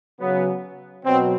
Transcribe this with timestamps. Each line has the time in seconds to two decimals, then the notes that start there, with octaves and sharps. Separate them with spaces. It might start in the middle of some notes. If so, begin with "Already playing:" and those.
0.20 C#3 F#3 B3
1.05 B2 F#3 C4